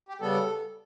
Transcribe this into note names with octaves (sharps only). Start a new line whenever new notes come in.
G4
C#3 G3 B3 A4